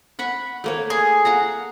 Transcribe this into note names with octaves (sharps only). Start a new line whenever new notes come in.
F#5 B5 C#6
A3 A#3 C#5
G#4
F5 F#5 A#5